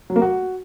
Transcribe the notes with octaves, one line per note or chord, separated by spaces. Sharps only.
F#3
A#3
F#4